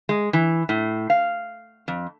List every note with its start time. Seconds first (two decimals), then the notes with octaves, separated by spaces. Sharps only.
0.09 G#3
0.33 E3
0.69 A2
1.10 F5
1.88 F2